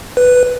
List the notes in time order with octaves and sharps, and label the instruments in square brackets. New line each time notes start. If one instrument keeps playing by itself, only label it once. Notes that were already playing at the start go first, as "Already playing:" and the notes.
[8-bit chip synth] B4